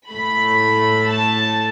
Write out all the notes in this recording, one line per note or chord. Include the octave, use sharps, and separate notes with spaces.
A2 A3 B5
A5